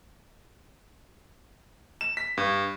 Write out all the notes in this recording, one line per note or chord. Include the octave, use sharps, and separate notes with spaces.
E7
B6
G2